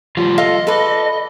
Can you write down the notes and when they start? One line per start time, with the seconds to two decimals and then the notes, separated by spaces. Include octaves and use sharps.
0.17 F3 G3 F4
0.38 F4 A4 D#5 F5
0.67 A4 B4 D5